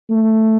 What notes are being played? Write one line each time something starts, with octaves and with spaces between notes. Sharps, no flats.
A3